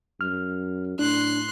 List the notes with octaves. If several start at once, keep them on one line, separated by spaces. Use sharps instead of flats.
F#2 F6
A2 D4 C6 F#6